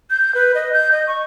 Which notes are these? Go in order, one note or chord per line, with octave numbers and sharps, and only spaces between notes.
G6
B4
D#5
G6
D#5
C#6